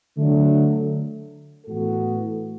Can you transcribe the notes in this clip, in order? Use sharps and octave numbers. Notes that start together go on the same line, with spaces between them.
D3 F#3 A3
A2 E3 B3 F#4 A4